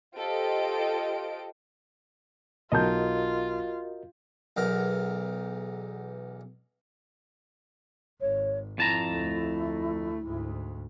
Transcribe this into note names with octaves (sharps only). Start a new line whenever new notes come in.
F4 G4 A4 C5 D#5 D7
B1 F4 F#4 A#4 D#5 A5 G6
B1 E2 A#4
G#1 C#5
F2 E4 A5 A#5
D2 A3
D2 G#2